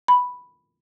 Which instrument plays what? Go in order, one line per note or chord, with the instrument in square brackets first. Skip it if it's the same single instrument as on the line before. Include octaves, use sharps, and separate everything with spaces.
[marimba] B5